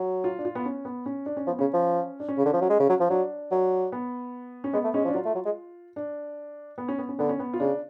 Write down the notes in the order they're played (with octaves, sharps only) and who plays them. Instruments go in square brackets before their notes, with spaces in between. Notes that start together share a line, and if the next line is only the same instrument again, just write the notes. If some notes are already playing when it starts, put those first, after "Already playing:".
Already playing: [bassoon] F#3
[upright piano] F4
D4
F4
B3
C#4
B3
C#4
D4
C#4
[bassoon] F3 [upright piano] B3
[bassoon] C#3 [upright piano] C#4
[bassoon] F3
[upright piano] D4
C#4
[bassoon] C#3
D3
F3
F#3
G#3
C#3
F#3
F3
[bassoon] F#3 [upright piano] D4
[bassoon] F#3
[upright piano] B3
C#4
[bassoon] G#3 [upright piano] B3
[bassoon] A3
[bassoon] G#3 [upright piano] C#4
[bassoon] F3
[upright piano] D4
[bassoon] F#3 [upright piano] F4
[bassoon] A3
F#3
G#3
[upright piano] D4
B3
C#4
B3
C#4
[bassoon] D3 [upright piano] B3
[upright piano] C#4
B3
F4
[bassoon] C#3 [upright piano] D4